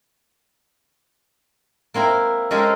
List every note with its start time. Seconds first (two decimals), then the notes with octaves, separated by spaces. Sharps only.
1.94 A#3 C4 E4 A#4
2.51 G#3 C#4 G4 A4 A#4 C5